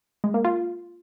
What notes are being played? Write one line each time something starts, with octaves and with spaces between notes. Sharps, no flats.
G#3
A#3
F4